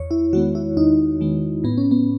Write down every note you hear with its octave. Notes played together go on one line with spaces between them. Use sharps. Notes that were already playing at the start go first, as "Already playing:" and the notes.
Already playing: E2 C#5
E4
D#3 G#3 B3 F#4
E4
E2 D#4
D#3 G#3 B3
A2 B3
C#4
B3